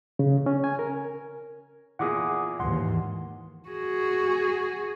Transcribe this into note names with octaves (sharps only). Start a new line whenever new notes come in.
C#3
C#4
G#5
A#4
E2 A#2 G#4 F#5 D6 D#6
D#2 G#2 E3 F#5 C6
F#4 G#4